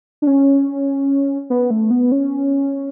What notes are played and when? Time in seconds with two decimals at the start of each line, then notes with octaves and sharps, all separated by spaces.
0.22 D4
0.27 C#4
1.50 B3
1.70 A3
1.91 B3
2.12 C#4